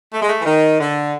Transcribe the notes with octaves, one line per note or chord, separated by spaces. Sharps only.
A3
G#3
A3
E3
D#3
D3